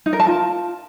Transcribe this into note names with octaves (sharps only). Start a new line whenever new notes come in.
D#4
A#4
A5
F4